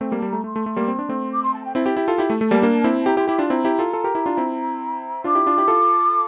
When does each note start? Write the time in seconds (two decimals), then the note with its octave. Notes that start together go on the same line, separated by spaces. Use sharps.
0.01 A3 C4 G5
0.11 G3 A#3 A5
0.22 G3
0.30 A3 A#5
0.44 A3 C6
0.56 A3
0.66 A3
0.76 G3 A#3
0.88 C4
0.99 D4
1.09 A3 C4
1.32 D6
1.42 C6
1.53 A5
1.64 G5
1.75 C4 E4 A5
1.86 E4 G4
1.97 E4 G4
2.08 F4 A4
2.18 E4 G4
2.30 A3
2.41 A3
2.51 G3 A#3
2.62 A#3 D4
2.84 C4 E4
3.06 E4 G4 A#5
3.17 E4 G4 C6
3.28 E4 G4 D6
3.38 D4 F4 C6
3.50 C4 E4 A#5
3.65 E4 G4
3.79 F4 A4
3.93 F4 A4
4.04 G4 A#4
4.15 E4 G4
4.26 D4 F4
4.37 C4 E4
5.24 D4 F4 D6
5.35 E4 G4
5.47 D4 F4
5.58 E4 G4
5.68 F4 A4